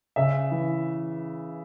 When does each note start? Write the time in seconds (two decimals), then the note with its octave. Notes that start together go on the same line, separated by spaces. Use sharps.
0.16 C#3 E5
0.51 E3